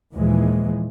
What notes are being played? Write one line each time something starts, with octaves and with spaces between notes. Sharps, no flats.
D#2 A#2 E3 F3 G#3